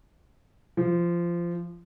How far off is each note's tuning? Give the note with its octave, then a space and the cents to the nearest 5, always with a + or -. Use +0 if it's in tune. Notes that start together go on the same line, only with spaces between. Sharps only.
F3 -20